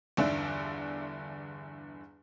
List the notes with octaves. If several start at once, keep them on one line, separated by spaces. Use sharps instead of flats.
G1 E2 D3 D4 D5 E5